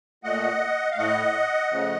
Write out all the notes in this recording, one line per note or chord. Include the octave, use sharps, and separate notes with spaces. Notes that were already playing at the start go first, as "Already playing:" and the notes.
A#2 A3 D#5 F#5
F5
A2 A3 D#5 F#5
C#3 F3 A3